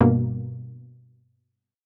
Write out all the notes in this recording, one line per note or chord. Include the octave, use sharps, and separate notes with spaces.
G2 B2 A#3